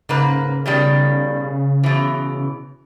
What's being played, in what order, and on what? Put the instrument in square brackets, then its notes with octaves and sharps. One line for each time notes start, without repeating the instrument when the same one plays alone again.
[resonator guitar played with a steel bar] G#2 A#3 B4 [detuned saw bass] C#3
[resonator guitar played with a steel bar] B2 D#3 G3
B2 E3